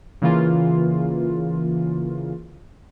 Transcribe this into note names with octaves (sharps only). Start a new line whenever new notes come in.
C#3 E3 A#3 F4